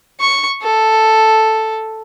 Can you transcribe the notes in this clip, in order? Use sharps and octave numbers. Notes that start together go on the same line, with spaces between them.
C#6
A4